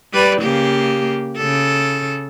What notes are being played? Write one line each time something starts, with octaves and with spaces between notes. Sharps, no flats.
G3 B4 D5
C#3 A#3 G4
C#3 A4